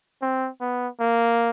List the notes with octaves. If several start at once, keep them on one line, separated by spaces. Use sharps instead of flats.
C4
B3
A#3